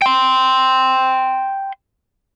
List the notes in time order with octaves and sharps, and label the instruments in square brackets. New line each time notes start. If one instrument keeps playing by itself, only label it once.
[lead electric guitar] G5 C6